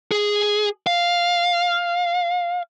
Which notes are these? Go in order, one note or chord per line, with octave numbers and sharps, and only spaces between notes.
G#4
F5